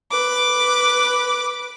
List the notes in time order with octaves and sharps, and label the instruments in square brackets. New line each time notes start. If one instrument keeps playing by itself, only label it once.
[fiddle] B4 D6